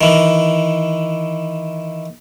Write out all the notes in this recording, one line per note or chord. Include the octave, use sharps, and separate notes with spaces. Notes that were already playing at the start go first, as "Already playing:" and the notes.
D#3 E3